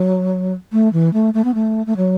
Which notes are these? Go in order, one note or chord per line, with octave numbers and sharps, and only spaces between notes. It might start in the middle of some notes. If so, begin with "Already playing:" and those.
Already playing: F#3
A3
E3
A3
A3
B3
A3
A3
F#3